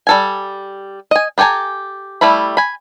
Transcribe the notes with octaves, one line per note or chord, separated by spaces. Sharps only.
G3 A4 G#5
D#5 G#5
B3 G4 A4 G#5 A#5
G3 A3 E4 B5
G#5 B5